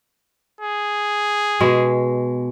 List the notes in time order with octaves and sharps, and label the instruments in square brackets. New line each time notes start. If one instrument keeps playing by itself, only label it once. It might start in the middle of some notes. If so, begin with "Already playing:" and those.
[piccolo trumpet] G#4
[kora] B2 G#3